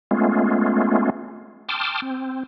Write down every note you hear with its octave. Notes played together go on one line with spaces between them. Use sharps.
G#3 A3 B3 C#4 F4
G5 A5 C6 D6 D#6 F6
C4